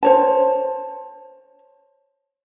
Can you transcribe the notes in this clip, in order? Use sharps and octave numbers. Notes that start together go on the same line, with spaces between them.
C5 C#5 A5